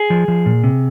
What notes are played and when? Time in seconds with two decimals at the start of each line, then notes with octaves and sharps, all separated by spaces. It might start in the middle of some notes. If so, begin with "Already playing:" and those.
Already playing: G#4
0.10 F3
0.28 F3
0.46 A#2
0.64 C3